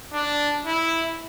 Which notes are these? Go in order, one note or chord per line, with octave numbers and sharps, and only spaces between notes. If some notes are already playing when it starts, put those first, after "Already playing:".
D4
E4